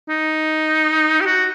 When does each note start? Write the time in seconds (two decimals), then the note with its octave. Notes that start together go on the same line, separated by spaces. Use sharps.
0.09 D#4
1.21 G4
1.26 F#4